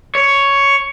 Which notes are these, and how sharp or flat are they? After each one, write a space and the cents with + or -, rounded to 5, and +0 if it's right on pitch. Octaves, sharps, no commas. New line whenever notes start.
C#5 +5